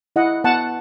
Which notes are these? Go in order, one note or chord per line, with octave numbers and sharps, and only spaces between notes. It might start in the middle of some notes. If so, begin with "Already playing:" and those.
E4 D#5 F#5
B3 F#5 A5